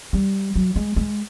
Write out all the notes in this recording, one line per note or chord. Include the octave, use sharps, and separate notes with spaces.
G3
F#3
G#3
G#3